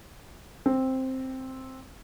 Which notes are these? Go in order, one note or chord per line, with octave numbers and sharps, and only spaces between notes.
C4